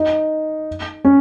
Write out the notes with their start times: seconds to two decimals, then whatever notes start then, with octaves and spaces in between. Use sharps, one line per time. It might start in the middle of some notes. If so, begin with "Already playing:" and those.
Already playing: D#4
1.05 C#4